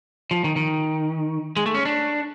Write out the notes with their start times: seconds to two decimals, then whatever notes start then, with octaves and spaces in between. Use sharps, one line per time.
0.31 F3
0.44 D#3
0.56 D#3
1.56 G#3
1.66 A3
1.75 C#4
1.85 D4